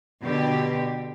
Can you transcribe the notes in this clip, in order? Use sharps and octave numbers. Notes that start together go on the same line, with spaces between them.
B2 D3 G4